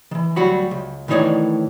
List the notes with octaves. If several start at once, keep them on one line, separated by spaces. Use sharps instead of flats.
D#3 E3
D2 F#3 G3 F#4 B5
C#2
A2 D#3 E3 D#4 C#5 D5